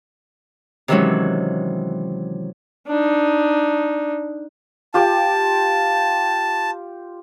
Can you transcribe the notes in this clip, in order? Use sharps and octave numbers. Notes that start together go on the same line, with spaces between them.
C3 D#3 E3 F#3 G#3 C#4
D4 D#4
F4 G4 D5 A5